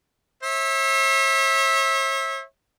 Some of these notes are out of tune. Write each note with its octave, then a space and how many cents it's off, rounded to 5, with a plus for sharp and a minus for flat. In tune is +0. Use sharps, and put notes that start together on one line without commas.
C#5 -45 E5 -15